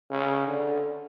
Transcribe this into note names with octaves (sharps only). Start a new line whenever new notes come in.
C#3
D3